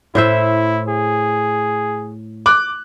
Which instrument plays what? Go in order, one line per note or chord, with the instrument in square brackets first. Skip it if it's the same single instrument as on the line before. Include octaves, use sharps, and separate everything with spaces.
[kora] A2 C5 E5 [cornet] E4
[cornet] G#4
[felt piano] D6 F#6